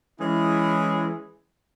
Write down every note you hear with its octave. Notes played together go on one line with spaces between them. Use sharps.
E3 G#3 C#4 E4 G#4